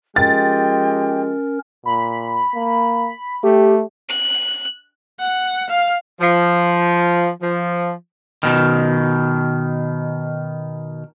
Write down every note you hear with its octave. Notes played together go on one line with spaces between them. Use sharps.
F3 G#3 C#4 G4 A#4 G5 A6
A#2 B5
A#3
A3 G4
F#6
F#5
F5
F3
F3
B2 D#3